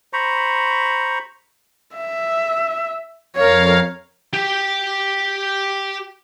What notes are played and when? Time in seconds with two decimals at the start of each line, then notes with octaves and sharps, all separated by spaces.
0.13 C5 A#5 B5 C#6
1.96 E5
3.37 F2 A#4 C#5 F5
4.33 G4 G5